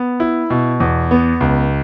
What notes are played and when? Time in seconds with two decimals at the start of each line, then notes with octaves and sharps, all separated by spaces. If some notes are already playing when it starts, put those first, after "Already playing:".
Already playing: B3
0.20 E4
0.50 B2
0.80 E2
1.11 B3
1.40 C#2